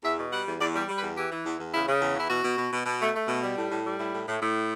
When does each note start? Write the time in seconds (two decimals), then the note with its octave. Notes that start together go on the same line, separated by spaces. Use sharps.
0.03 E2 E5
0.17 B2
0.32 G3 F#5
0.46 E2
0.60 E2 D5
0.74 G3
0.88 G3
0.97 B4
1.02 E2
1.17 E3 G4
1.31 E3
1.45 E2
1.58 E2
1.73 C#3 E4
1.87 C#3
2.01 E2
2.15 E3 E4
2.29 B2 F#4
2.44 B2
2.57 B2
2.72 B2
2.85 B2
3.00 A3
3.14 A3
3.28 B2
3.42 G3
3.57 A2
3.71 A2
3.85 G3
3.98 A2 E4
4.12 A2
4.27 A2
4.40 A2